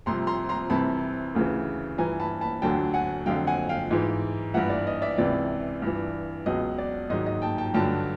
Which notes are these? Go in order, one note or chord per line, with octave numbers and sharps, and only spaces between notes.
C2 C3 F3 A#5 C6
A#5 C6
A#5 C6
C2 C3 E3 A5 B5
D2 C#3 E3
G2 E3 G#5 A#5
A5 B5
A5 B5
D2 D3 F#3 G5 A5
F#5 G#5
F2 D3 F#3 F5 G5
F#5 G#5
F5 G5
G#2 E3
G2 E3 E5 F#5
D5
D#5
D5 E5
C#2 C3 E3 D5
G2 E3
C#2 B2 F#3 D#5
D5
G#2 D#3 F#3 D#5
D#5
G5 A5
G5 A5
G2 D3 F#3 G5 A5